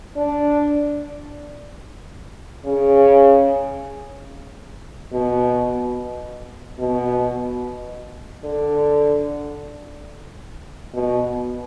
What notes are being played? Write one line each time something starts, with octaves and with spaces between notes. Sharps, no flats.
D4
C#3
B2
B2
D3
B2